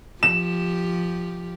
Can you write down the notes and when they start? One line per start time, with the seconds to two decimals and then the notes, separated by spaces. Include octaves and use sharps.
0.23 F3 G4 E7